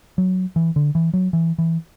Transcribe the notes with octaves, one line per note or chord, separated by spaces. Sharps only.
F#3
E3
D3
E3
F#3
E3
E3